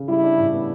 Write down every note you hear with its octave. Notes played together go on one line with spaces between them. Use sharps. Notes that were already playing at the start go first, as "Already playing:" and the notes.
Already playing: C#3
G3 E4
D4
A2
B3